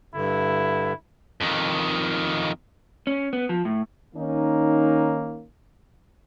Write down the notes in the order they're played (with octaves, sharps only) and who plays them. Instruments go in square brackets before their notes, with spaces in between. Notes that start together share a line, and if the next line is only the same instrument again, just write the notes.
[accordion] G2 D3 [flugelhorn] E4
[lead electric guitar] F2 D#3
[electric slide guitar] C#4
B3
F3
A2
[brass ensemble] D#3 A#3 C#4 D#4